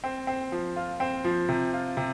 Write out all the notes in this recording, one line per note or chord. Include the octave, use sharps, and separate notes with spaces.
C4
C4
F3
F4
C4
F3
C3
F4
C3